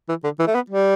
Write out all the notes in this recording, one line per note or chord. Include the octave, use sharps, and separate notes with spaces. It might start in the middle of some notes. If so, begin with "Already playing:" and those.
E3
D3
E3
A3
B3
G3